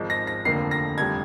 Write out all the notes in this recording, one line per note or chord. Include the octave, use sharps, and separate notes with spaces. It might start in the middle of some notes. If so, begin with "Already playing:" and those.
Already playing: G#1 G#2 F3
A#6
A#6
F1 D#2 D3 F3 A#3 C7
A#6
F1 D#2 D3 G3 G#6